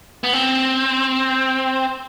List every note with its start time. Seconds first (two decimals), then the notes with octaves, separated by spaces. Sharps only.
0.24 B3
0.33 C4